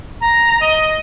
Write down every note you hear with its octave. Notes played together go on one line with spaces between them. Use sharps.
A#5
D#5